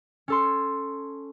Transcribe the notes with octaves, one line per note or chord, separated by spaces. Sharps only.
C#4 A4 C6